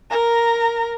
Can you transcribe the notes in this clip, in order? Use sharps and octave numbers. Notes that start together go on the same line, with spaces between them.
A#4 A#5